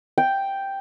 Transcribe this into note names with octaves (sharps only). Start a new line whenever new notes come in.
G5